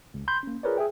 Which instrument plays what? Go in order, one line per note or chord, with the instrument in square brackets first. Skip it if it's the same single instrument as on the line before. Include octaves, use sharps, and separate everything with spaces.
[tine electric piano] C#2
B5 C6 G6
A#3 C#4
F4 G#4 A#4 B4 C#5 D5
G#4 E5 G5